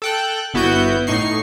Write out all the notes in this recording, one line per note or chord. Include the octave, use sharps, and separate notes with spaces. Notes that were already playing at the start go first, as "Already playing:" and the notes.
A4 G5 F#6
G1 B3 E4 F#4 G6
A2 D#4 C#6 C7